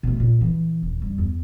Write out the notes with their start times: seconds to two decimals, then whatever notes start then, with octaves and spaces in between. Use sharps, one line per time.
0.03 B2 A3
0.20 A#2
0.41 E3
0.82 D#1
1.02 G2
1.18 E2